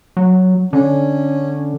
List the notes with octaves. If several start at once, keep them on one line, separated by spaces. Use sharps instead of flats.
F#3
D3 C#4